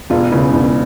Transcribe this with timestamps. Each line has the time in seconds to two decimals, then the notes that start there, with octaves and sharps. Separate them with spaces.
0.10 E1 F4
0.31 C#3 E4
0.53 E1 E4